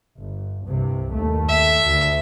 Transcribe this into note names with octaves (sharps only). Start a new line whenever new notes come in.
G1
C2 G2 C3
D#2 A3
E5
D2